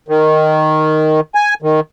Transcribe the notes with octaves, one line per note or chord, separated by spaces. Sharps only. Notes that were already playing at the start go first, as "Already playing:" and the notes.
D#3
G#5
D#3